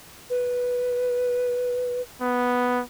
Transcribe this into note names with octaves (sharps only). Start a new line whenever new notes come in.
B4
B3